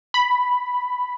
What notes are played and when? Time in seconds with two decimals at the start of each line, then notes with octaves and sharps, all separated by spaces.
0.14 B5